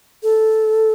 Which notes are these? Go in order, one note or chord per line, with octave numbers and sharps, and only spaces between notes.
A4